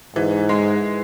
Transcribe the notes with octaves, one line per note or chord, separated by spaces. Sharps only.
G#2 E3
G#3